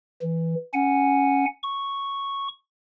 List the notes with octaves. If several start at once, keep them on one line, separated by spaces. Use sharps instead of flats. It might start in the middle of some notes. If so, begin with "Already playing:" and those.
E3
C#4 F#5 G#5
C#6